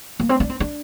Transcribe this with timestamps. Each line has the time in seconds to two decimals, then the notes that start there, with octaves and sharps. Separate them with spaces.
0.20 A#3
0.29 C4
0.40 D4
0.50 C4
0.60 D4